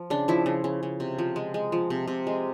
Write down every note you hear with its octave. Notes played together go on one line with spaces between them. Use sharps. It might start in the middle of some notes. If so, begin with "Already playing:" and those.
Already playing: F3
C#3 D4
F3 E4
C#3
C#3
C#3
C3
F3
G#3
G#3
F3
C3
C3
G#3